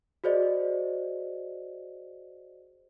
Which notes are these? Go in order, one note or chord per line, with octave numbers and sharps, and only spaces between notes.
F#4 G#4 C5 D5 D#5